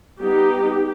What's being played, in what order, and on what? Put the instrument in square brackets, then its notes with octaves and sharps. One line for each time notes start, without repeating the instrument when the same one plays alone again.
[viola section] G3 B3 D#4 G4